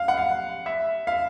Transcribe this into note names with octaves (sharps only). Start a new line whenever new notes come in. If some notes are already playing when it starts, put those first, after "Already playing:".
Already playing: F5
F#5
F5
E5
F5